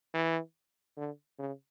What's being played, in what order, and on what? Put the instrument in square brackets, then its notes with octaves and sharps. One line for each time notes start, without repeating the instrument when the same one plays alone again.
[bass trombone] E3
D3
C#3